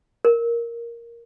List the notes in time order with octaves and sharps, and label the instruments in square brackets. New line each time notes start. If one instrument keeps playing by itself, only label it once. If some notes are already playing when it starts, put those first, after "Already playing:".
[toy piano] A#4